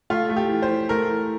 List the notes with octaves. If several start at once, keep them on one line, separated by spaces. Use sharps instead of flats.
A3 F4
A3
G4
E3
C5
E3
A3 A#4
E3